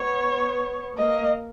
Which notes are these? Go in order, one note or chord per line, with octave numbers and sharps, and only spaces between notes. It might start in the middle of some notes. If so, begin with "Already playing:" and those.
Already playing: B3 C#5
A#3 D#5